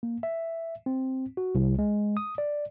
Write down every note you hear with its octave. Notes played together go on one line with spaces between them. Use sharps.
A#3
E5
C4
F#4
C2
G#3
D#6
D5